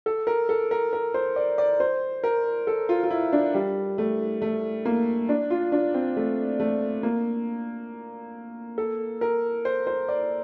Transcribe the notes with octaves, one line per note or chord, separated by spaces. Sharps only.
A4
A#4
A4
A#4
A#4
C5
D5
D5
C5
A#4
A4
F4
F4
E4
D4
G3
A3
A3
A#3
D4
F4
D4
C4
A3
A3
A#3
A4
A#4
C5
C5
D5